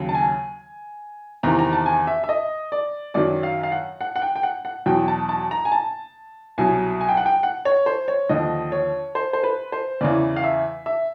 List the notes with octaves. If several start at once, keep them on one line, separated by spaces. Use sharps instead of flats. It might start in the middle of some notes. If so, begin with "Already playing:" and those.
Already playing: D#2 C#3 F#3
A5
G#5
E2 C3 D#3 A#5
A#5
A5
G#5
E5
E5
D#5
D5
F#2 D#3 F#3 D5
F5
F5
F#5
F#5
F#5
G5
G5
F#5
F#5
E2 B2 F#3 G5
A5
A5
A#5
G#5
A5
C2 B2 F#3 G#5
G#5
G5
F#5
G5
F#5
C#5
C5
C#5
D#2 D3 F3 D#5
C#5
C5
C5
B4
C5
E2 C#3 E3 D5
F5
E5
E5